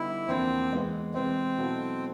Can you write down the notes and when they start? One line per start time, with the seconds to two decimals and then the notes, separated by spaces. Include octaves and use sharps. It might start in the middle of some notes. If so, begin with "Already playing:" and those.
Already playing: D3 G3 B3 D#4 E4 G4
0.28 E2 C3 F3 A#3 C4 D4
0.71 E3 G#3 B3
1.14 C3 E3 G#3 C4
1.57 B2 F#3 B3 E4 A4